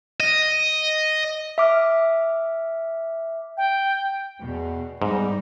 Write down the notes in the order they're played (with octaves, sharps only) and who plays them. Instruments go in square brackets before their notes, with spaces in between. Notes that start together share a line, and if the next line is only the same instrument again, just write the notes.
[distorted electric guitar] D#5
[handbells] E5 D6 F6
[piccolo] G5
[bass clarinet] E2 [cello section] B2
[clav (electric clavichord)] G#2 [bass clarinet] G3 [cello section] B3 D#4